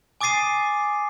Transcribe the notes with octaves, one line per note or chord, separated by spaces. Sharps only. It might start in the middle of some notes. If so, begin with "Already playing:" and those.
G#5 D6 D#6 A6 C7 D#7